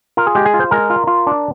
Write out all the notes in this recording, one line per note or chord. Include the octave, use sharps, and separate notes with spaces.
F4 A#4
G#4
G#3 G4
G#4
F4
C5
G#3 A#4
F4
F4
D4